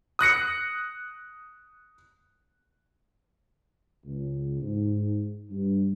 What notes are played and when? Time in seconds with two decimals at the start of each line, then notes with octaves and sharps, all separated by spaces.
0.19 D#6 F#6 A#6 C#7
4.05 C#2
4.62 G#2
5.51 G2